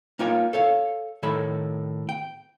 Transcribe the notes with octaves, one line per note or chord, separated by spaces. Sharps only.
A#3 D#4 F4 C#5 G5 G#5
A4 C#5 F5
A2 D#3 A4 C#5 B5
G5